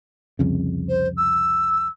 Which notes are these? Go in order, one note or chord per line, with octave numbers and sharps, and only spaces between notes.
C2 F2 C#3
C5
E6